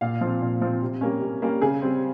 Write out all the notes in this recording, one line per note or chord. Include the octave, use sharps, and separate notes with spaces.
A#2 F5
F3 C4
A#2
F3 C4
C3
G3 A#3 C#4
C3
G3 A#3 C#4
C#3 G#4
G3 C4